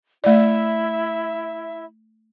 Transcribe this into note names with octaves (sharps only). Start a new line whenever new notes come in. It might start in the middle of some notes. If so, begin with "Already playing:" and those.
A3 E4 D5 E5